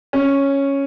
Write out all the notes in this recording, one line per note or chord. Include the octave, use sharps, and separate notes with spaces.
C#4